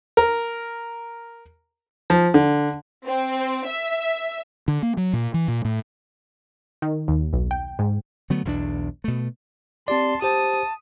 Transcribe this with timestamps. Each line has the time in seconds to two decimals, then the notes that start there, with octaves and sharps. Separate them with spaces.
0.17 A#4
2.10 F3
2.34 D3
3.07 C4
3.67 E5
4.68 D3
4.83 A#3
4.97 F#3
5.13 A#2
5.34 E3
5.48 A#2
5.65 A2
6.82 D#3
7.08 D#2
7.33 B1
7.51 G5
7.79 G#2
8.30 D3 F#3 A3 B3
8.45 B1 E2 C4 D4
9.04 B2 A3
9.88 C4 G4 D5 A5 C6
10.22 G4 C5 A5 D#6